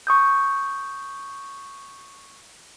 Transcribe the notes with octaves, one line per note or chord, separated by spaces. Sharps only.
C#6 D#6 G6